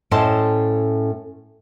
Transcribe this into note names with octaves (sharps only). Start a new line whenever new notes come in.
A2 C#4 A4 C5 D#5 A5